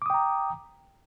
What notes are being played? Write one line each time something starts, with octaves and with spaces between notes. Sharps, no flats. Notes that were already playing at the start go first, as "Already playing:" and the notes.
G5 A#5 D6 D#6